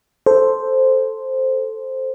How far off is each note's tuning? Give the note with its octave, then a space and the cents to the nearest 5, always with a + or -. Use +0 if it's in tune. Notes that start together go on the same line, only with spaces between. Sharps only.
A4 +0 C5 +0